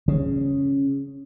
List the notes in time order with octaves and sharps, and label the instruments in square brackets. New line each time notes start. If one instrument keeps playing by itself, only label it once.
[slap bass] C#3